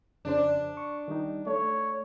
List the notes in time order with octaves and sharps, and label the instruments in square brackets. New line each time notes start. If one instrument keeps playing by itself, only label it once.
[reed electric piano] F2 C#3 C5 [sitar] D4
[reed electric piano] C#6
D#3 G3 D#4
[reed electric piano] A3 [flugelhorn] C#5